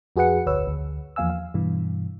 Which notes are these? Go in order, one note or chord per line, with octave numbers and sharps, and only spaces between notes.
F2 F#4 G#4 B4 F#5 C#7
G1 D2 B4 C#5 E6
D2
E2 F3 A#3 F5 G#5 E6
F5
G2 B2 E3